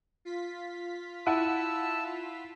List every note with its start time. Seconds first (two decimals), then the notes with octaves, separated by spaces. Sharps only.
0.25 F4 B6
1.26 E4 F#5 A5 E6 D#7